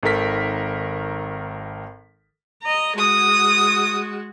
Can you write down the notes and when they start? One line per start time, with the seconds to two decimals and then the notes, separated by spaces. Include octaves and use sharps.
0.03 G#1 D#3 A4 A#4 B6
2.63 D#5 A#5
2.98 G#3 F#4 D#6